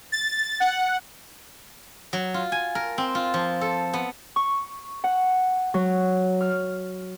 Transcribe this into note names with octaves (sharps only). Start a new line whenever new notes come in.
A6
F#5
F#3
F4
G#5
A#4
C4
F4
F3
A4
B3
C#6
F#5
F#3
F6